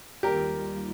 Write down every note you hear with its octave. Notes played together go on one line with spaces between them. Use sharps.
D#2 D#3 G3 A#3 F4 G4 A#4